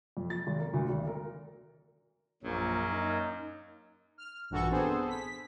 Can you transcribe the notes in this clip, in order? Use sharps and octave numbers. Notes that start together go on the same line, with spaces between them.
F2
A6
G#1
A#4
D2
G#1
A#4
A#1 F#2 F#3 A#3
D#4
F6
A#1 G2 E3 F#4 A4 C#6
B3 C4 D4 G#4 A4 C5
B6